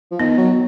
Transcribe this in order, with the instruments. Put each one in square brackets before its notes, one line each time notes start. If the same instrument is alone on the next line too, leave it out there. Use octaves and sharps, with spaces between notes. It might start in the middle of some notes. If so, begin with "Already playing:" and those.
[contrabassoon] F3
[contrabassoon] D#3 [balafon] B3
[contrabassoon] F#3